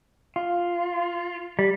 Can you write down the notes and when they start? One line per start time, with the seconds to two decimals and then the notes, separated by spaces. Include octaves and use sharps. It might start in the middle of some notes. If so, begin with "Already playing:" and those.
0.36 F4
1.59 G3